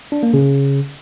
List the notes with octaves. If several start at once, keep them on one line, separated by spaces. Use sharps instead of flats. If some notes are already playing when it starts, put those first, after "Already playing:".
D4
A#3
C#3